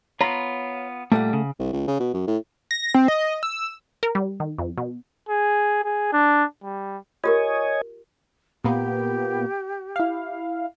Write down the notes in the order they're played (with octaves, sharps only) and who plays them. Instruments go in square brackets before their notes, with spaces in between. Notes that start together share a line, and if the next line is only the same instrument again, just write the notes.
[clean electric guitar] B3 F4 [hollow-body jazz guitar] C#5 A#5 B5
[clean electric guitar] A#2 G3 [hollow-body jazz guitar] A3 A4 F#5
[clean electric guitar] C#3
[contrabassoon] C2
C#2
C#3
B2
F#2
A2
[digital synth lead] A#6
C4
D#5
E6
[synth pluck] A#4
G3
D#3
F2
B2
[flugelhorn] G#4
G#4
D4
G3
[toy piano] F4 G4 A#4 [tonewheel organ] C#5 D#5 G#5
[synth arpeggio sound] A#2 A#3 B3 [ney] G4
[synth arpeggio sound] E4 F5